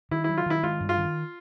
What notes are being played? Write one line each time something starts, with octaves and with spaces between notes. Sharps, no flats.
D#3 E4
F#3 E4
F4
D#3 E4
G#3 F4
G2
F4
D#3